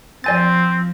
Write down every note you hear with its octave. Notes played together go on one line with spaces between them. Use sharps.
F3 C4 D5 G#5 A6